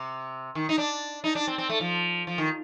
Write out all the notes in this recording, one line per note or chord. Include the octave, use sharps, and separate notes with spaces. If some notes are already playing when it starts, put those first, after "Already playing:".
Already playing: C3
D#3
D#4
D4
D#4
D4
C4
C4
A3
F3
F3
D#3